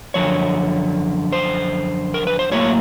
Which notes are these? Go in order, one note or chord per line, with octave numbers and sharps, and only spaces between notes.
F#2 D3 F3 C#5
C5
A#4
B4
C5
A2 F#3 A#3 C#5